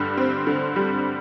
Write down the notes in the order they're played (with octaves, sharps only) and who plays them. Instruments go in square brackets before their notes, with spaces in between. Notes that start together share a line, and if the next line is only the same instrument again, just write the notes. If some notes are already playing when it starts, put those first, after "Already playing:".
Already playing: [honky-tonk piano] G2 D3 G3
C4
D3
G3